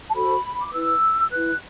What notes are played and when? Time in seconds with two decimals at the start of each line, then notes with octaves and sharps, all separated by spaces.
0.10 A5
0.14 F#4 A4 C5 B5
0.62 D6
0.72 E4 B4 E6
1.31 E4 B4 F#6